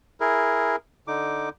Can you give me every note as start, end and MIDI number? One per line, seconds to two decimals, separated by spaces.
0.20 0.76 64
0.20 0.76 68
0.20 0.76 70
1.07 1.49 50
1.07 1.49 63
1.07 1.49 86